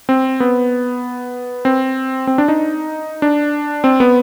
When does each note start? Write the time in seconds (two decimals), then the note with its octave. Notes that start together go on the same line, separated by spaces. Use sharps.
0.09 C4
0.40 B3
1.65 C4
2.27 C4
2.38 D4
2.48 D#4
3.22 D4
3.84 C4
4.00 B3